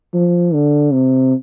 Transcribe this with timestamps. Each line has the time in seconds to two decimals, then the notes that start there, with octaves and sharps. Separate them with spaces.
0.14 F3
0.54 D3
0.93 C3